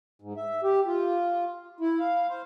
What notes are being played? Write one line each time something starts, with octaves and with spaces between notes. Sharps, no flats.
G#2
E5
G4
F4
E4
F5
C5